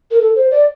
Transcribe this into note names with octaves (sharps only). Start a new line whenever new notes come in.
A#4
A4
C5
D5